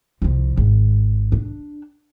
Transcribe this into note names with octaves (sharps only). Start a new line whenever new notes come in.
C2 F3
G#1
D4